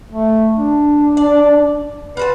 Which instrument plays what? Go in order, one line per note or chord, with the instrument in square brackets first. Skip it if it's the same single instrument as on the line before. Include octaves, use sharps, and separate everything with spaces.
[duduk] A3
D4
[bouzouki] D5
[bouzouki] F4 F#4 A5 [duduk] B4